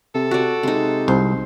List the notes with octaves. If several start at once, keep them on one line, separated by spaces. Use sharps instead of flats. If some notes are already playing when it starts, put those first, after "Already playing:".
C3 A4
F#4 D5
C3 G#3 D#4
C2 C5